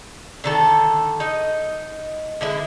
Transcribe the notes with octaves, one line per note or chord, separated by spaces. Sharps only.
D3 D#3 A4
D#4 D#5
D3 G#3 E4